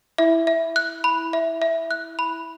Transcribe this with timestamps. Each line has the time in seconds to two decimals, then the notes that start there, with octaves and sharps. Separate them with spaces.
0.18 E4 E5
0.47 E5
0.76 F#6
1.04 B5
1.33 E5
1.62 E5
1.91 F#6
2.19 B5